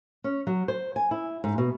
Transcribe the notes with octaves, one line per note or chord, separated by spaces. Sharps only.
C#4
F#3
C5
G#5
E4
G#2
B2